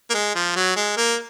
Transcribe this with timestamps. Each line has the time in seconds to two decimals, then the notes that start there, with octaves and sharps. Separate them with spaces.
0.10 A#3
0.14 G#3
0.35 F3
0.56 F#3
0.76 G#3
0.97 A#3